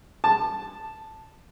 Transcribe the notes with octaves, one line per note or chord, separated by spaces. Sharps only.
A5